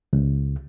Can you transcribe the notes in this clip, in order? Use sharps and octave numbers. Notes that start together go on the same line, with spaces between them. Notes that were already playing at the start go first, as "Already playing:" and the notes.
C#2